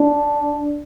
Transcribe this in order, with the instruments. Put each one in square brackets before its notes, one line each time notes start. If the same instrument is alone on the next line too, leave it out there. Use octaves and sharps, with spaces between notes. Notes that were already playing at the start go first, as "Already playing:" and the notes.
Already playing: [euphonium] D4